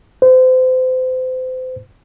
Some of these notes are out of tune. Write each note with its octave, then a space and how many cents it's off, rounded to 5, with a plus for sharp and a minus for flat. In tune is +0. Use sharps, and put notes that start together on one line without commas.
C5 -30